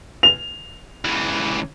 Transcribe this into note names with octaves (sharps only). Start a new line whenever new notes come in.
F7
C#2 E3